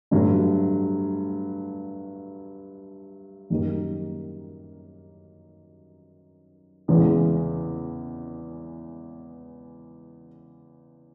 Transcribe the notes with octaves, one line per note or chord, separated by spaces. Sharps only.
G2 D3 F#3 A3
F#2 D#3 G3 A#3
E2 C#3 E3 G#3 C#4